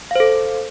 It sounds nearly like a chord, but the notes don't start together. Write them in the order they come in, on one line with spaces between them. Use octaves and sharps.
F5 C5 A4